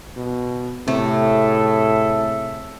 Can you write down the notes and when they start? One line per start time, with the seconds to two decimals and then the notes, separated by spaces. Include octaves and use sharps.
0.17 B2
0.88 A2 C3 A3 G#4 A4 E5